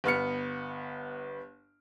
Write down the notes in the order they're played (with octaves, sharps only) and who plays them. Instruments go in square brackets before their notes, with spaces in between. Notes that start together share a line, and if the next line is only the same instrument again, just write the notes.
[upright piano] G1 B3 F6 C#7